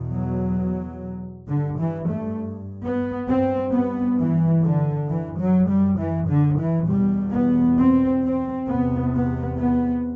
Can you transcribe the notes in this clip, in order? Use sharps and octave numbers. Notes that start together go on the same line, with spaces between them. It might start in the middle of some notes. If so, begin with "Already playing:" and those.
Already playing: E2 B2
F#3
G2 D3
E3
A3
B3
G2 C4
B3
E3
D3
F#2 E3
F#3
G3
E3
D3
E3
E2 B2 G3
B3
C4
C4
E2 C3 B3
B3
B3